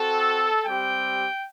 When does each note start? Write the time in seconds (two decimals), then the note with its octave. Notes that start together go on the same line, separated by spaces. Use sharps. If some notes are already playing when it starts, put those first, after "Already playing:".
Already playing: C4 F#4 A4
0.65 G3 C4 G4 G5